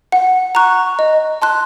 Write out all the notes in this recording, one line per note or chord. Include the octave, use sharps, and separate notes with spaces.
F#5
A#5 C#6 F#6
D#5
A5 C6 F#6